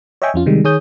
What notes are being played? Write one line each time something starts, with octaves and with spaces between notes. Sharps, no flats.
C#5 D#5 E5 G5 G#5 C#6
F2 C#4 F4
C3 D#3 G3 G#3
D#3 G#4 C#5 D#6 G6